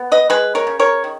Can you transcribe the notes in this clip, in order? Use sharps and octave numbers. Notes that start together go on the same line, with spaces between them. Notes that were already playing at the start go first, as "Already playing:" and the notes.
Already playing: B3
B4 D#5
G#3 G#4 B4
A#4 C#5
C#3
A#4 C#5
D#3